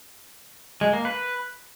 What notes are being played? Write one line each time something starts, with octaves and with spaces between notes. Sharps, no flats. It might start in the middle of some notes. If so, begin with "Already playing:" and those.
G#3
A#3
B4